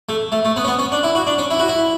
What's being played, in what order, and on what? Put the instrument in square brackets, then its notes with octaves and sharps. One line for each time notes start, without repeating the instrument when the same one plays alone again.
[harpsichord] A3
A3
A3
B3
C#4
B3
C#4
D4
E4
F#4
D4
C#4
E4
F#4
E4